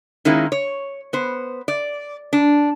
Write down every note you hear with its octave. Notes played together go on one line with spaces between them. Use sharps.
D#3 G#3 A#3 C#4 E4
C#5
B3 C5
D5
D4